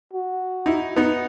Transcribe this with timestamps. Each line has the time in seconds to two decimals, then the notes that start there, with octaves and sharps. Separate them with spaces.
0.13 F#4
0.66 D#4 E4
0.96 B3 D#4